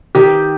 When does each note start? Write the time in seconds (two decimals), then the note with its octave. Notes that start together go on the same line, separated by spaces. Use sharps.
0.15 D#3 G4